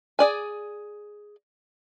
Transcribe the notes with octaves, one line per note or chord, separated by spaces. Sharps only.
G#4 D5 G#5